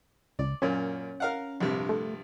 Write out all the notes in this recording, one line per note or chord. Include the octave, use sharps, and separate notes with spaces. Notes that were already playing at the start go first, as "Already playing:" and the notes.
C#2 D5
F#2 A#2 C#4
A#4 F5 F#5
A#1 G2 C3
A3